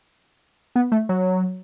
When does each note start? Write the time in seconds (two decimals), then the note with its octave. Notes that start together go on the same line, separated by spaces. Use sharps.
0.76 B3
0.92 A3
1.09 F#3